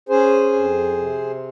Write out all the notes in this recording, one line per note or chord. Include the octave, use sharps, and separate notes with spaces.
C#4 G#4 C5
F2
C3